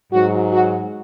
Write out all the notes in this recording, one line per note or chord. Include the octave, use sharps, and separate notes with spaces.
G#2 F#3 F#4
F#4